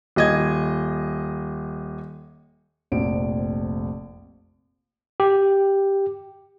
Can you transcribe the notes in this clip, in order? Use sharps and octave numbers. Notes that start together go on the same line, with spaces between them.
D#1 D#5 G#6
F1 A#1 C4 D7
G4